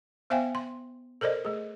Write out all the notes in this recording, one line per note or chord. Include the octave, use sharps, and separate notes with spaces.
B3 C5 E5 F5 G5 G#5
C6
A4 A#4 C5 D5 D#5
A3 G#4